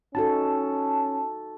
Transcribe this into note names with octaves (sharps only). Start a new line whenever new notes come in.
C#4 D#4 F#4 A4 A5